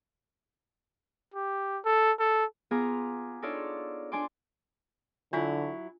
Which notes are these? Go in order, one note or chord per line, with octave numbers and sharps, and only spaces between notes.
G4
A4
A4
B3 F4 G#4 A#5 D6
D4 D#4 F4 A4 C#5 D5
D4 D5 G#5 C6 D6
D3 F#3 D4 E4 F4